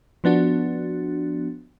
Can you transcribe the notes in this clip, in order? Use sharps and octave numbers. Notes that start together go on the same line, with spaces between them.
F3 B3 D4 F#4